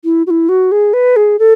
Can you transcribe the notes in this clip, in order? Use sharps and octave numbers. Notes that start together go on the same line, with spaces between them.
E4
F#4
E4
F#4
G#4
B4
G#4
A4